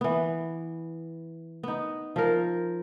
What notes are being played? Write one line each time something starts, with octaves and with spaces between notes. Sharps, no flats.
E3 B3
B3 D#4
F3 A#4